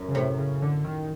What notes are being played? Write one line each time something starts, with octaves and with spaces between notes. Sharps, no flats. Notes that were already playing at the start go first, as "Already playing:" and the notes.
Already playing: F#2
C#3
A2 C3
C#3
D3
D#3